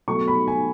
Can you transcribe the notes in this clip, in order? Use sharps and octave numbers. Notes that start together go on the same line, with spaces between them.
B2 F#3 A3 C#6
B5
G#5